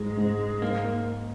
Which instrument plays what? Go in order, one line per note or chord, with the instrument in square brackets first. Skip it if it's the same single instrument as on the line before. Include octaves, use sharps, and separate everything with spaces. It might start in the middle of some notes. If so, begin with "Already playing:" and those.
Already playing: [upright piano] G#2 [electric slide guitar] G#3
[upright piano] G#2
[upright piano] G#2 [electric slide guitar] A#3